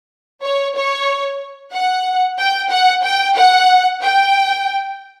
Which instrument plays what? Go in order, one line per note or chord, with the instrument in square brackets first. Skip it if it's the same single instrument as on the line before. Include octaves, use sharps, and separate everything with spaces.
[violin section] C#5
C#5
F#5
G5
F#5
G5
F#5
G5